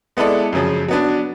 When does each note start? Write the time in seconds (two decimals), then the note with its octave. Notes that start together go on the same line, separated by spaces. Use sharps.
0.17 G#3 B3 E4 A4 D5
0.53 F#2 C#3 F3
0.88 F#3 B3 D4